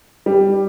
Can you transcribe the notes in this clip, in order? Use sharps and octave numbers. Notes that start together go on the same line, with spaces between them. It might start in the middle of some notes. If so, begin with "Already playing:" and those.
G3